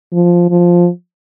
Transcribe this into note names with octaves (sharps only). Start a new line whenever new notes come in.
F3
F3